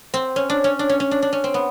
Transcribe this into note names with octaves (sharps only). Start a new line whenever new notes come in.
C4
C#4
D4
C#4
D4
C#4
C#4
D4
D4
C#4
C4
B3